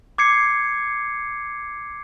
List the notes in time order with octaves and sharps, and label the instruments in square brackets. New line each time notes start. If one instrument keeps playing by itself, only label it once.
[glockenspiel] D6 G#6 C7 C#7